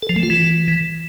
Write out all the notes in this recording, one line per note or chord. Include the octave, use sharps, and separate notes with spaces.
A4
F3
A3
F4
E3